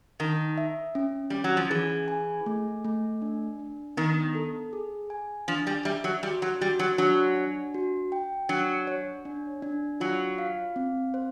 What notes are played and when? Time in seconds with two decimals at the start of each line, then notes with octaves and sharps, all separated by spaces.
0.20 D#3 D#4
0.58 E5
0.95 C#4
1.30 G3 C#4
1.44 F#3
1.57 F3
1.70 E3 G#4
2.08 G#5
2.46 A3
2.85 A3
3.22 D4
3.59 D4
3.97 D#3 B3
4.35 A4
4.73 G#4
5.10 G#5
5.48 F3 D4
5.67 G3
5.85 G3 E5
6.04 F#3
6.23 G3 F#4
6.42 F#3
6.61 G3 F#4
6.79 F#3
6.98 F#3 D4
7.36 D4
7.74 F#4
8.12 G5
8.49 F#3 D4
8.87 C#5
9.25 D4
9.62 D4
10.00 F#3 F4
10.38 F5
10.76 C4
11.14 C5